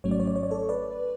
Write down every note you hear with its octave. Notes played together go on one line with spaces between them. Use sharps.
G#1 G#2 F#3 A3 C#4 C#5
D5
C#5
D5
C#5
D5
A4 C#5
B4 D5